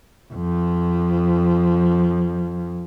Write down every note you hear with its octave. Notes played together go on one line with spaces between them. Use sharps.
F2 F3